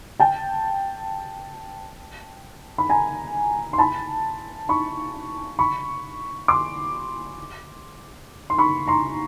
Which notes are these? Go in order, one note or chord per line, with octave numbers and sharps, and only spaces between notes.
G5 A5
B5
G#5 A#5
C6
A5 B5
B5 C#6
B5 C#6
C6 D6
C6
B5 C#6
A#5 C6